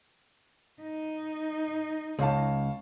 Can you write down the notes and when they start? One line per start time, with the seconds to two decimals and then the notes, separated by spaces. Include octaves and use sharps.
0.82 D#4
2.19 C#2 C#5 F5 A5